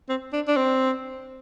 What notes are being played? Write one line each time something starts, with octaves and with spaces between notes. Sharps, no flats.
C4
D4
D4
C4